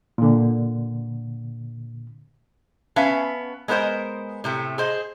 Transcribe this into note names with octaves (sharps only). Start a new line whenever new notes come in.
A#2 D3
B3 C#4 E5 F5 A5
G#3 B3 A#4 C5 D#5
A2 C3 A3
G#4 C5 D#5